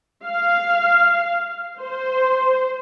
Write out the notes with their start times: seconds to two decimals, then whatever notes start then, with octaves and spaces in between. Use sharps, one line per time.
0.24 F5
1.79 C5